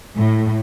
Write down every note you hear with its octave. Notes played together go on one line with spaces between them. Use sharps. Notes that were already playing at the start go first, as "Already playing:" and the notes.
A2